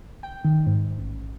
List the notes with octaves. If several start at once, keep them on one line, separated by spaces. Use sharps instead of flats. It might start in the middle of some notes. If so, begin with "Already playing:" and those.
G5
D#3
G#2
A1